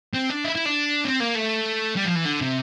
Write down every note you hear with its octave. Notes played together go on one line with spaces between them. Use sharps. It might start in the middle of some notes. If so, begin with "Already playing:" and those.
C4
D4
E4
E4
D4
C4
A#3
A3
G3
F3
E3
D3
C3